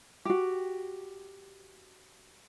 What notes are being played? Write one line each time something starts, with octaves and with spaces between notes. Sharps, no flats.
F#4 G4